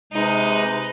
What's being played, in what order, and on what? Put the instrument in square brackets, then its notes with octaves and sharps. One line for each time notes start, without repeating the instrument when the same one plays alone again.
[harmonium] C3 G#3 [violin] D#4 B4